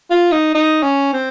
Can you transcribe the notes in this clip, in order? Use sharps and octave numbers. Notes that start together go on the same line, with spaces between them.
F4
D#4
D#4
C#4
C4